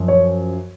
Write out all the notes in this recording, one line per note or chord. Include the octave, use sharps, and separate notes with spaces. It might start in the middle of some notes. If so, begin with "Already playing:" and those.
Already playing: F#2 F3
C#5